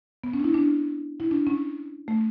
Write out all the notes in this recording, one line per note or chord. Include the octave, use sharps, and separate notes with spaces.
B3
C#4
D4
E4
D4
E4
D4
C#4
A3